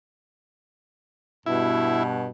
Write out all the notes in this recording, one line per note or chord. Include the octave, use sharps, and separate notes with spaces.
G2 B2 E4